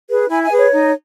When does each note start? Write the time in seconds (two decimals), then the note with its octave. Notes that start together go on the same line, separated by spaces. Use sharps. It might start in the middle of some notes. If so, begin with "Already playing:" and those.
0.08 G#4 B4
0.29 E4 G#5 B5
0.43 E5 G#5
0.50 G#4 B4
0.58 C#5
0.72 D#4